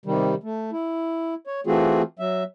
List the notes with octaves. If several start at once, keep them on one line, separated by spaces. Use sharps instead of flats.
C3 D#3 G3
A3
E4
C#5
E3 A3 C4 F4 F#4 G#4
F#3 E5